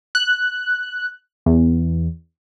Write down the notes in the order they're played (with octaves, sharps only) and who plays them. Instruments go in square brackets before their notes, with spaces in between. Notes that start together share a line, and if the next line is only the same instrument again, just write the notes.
[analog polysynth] F#6
E2